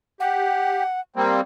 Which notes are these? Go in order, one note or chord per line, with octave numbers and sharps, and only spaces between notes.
G4 F#5
G3 A#3 C4